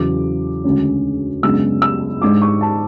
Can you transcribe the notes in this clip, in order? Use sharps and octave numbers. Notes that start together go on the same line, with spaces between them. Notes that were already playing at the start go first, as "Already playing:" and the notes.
Already playing: E2 C#3 F#3 D6
D2 C#3 G#3 C#4
F#2 C#3 G#3 B3 D4 E6
E6
G#2 G#3 D4 D6
C#6
A5